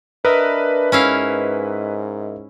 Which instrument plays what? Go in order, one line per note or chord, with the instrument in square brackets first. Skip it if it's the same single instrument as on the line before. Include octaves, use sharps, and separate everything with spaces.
[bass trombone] D4 [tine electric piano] A#4 D#5 E5 [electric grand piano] B4
[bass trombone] G#2 [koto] C#4 E4 F5